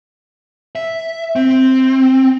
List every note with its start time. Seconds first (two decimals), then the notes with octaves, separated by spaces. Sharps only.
0.76 E5
1.36 C4